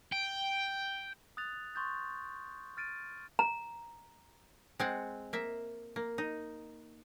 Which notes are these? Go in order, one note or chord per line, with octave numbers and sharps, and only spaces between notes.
G5
D#6 F#6 A6 F7
C6 C#6 D#6 G6 A6
F6 A6 D7 D#7
A#5
G#3 C4 F#5
A#3 E5
A#3
D#4